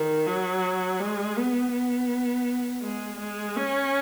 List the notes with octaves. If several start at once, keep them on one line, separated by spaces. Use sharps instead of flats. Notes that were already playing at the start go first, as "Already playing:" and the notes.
Already playing: D#3
F#3
G#3
B3
B3
G#3
G#3
C#4